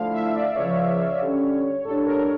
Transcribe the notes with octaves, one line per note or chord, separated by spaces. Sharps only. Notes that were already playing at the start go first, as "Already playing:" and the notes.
Already playing: D3 F3 A3 E4 F5
E5
D5
C#2 C#3 F3 C#5
D3 G3 C#4
A2 G3 D4 A4
A#4